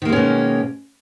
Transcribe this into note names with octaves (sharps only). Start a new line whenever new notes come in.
B2 D#3 G#3 A#3 C#4